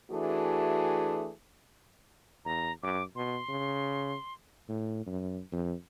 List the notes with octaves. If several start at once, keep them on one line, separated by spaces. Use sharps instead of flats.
E3 A3 D4 F#4 G#4
E2 A#5
F#2 D6
B2 C6
C#3
A2
F#2
F2